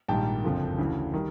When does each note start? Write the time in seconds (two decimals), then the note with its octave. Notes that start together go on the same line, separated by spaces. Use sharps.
0.08 A#1 G#2 D#3 G3 A#3 G5 A5
0.44 F#1 F2 D3 F3
0.78 D2 C#3 E3
1.14 D#3 G3